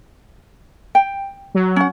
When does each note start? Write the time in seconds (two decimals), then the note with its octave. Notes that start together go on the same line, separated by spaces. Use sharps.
0.95 G5
1.55 F#3
1.76 C#4 F#5